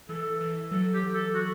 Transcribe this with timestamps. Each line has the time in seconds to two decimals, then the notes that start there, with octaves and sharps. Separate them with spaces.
0.09 E3 A4
0.41 E3
0.71 F#3 A4
0.92 G4
1.14 A4
1.35 F#4